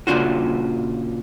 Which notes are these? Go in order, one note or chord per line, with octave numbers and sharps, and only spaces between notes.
A#2 C#3 D4 F4 F#4